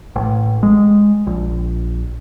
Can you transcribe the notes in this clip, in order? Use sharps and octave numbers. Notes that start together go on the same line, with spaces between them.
A1
G#3
A#1